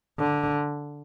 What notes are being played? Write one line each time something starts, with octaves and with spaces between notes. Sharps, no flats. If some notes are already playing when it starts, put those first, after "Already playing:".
D3